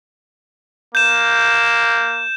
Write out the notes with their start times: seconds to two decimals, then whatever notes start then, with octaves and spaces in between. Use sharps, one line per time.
0.95 A#3 G6 E7